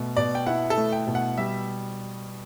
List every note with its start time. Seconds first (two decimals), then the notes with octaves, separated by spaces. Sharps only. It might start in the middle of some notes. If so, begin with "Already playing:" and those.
Already playing: B2 A3
0.17 B2 D5
0.35 G5
0.46 E4 F#5
0.70 A4
0.77 A3
0.93 G5
1.07 B2
1.15 F#5
1.37 G3 E5